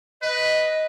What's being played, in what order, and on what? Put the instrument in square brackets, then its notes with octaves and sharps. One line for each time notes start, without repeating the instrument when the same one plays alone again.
[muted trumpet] B4 [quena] D#5